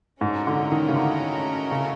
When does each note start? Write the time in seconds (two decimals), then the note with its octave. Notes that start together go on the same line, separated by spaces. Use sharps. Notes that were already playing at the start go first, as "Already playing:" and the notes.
0.21 G#2 A3 C#4 F#4 A#4 D#5
0.47 D3
0.72 D#3
0.88 C#3
0.96 D3
1.71 C#3